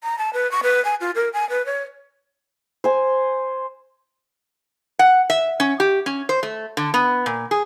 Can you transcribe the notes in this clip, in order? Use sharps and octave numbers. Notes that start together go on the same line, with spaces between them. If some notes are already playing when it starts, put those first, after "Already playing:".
A#5
A5
B4
C#6
B4
G#5
F4
A#4
G#5
B4
C#5
C5 G#5
F#5
E5
C#4
G4
C#4
C5
A3
D3
B3
A#2
G#4